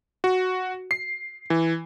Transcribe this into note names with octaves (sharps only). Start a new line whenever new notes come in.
F#4
C7
E3